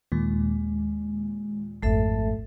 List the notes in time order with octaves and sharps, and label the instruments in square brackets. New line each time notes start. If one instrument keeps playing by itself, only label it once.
[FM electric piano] D#2 A#2 [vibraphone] G#3
[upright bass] G#1 F2 [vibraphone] A3 A4 E5